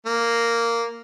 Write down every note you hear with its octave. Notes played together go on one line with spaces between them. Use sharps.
A#3